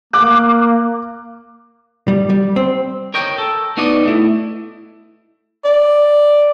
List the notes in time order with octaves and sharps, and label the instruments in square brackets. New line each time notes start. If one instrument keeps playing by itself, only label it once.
[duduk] A#3 [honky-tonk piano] D6 F#6
[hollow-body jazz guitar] G3
G3
C4
[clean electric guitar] A#4 C#5 D#5 G5
A4
B3 D#4 F#4 D5 D#5
A3 E4
[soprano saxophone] D5